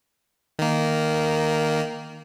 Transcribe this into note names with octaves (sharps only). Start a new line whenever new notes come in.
D#3 A#3